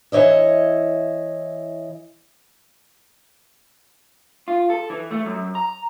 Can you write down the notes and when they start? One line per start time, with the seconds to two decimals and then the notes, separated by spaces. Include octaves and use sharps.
0.12 E3 C#5 D#5 E5
4.48 F4
4.70 A4
4.90 E3
5.11 A3
5.26 F#2
5.55 A#5